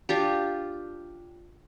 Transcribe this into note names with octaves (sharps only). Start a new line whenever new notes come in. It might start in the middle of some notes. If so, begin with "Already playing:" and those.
D4 F4 G4